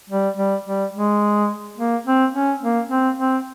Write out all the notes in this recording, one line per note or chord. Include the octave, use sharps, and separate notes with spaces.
G3
G3
G3
G#3
A#3
C4
C#4
A#3
C4
C4